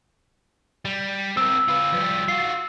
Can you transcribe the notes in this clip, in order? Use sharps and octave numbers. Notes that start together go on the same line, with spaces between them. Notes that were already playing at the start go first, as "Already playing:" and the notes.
G3
C4 A#4 E6
F4 B4
F3 G3
F4 F#4 C7